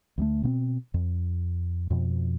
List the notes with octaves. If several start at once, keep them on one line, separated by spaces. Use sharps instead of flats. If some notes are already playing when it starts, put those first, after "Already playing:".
D2 G3 A3
B2 B3 C4
F2
F2 B2 F3